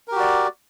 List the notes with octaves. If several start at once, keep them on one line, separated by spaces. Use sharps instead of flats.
F#4 G4 A#4 D5